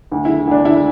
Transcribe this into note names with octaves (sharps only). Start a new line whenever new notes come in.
D2
E4
D3
D2 D4
D3 E4